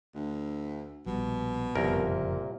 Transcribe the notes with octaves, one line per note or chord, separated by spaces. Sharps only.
D2
A#1 B2 G3
F#1 C2 F2 A#2 A#4